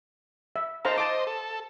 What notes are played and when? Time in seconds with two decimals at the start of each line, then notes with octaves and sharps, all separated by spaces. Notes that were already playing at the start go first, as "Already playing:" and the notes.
0.56 E5
0.85 D#4 A4 C5 F5 A#5
0.98 C5 D#5 A5 D6
1.27 A4